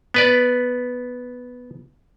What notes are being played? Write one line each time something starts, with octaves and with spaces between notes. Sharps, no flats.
B3 B4 D5